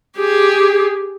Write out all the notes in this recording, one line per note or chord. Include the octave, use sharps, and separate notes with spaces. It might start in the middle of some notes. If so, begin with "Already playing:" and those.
G4 G#4